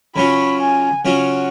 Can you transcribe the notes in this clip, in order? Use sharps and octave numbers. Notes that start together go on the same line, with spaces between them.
C#3 F#3 C#4 F4 B5
G#5
C#3 F#3 C#4 F4 F#5